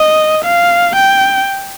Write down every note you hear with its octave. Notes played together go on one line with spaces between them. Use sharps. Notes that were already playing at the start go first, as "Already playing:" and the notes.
Already playing: D#5
F5
G5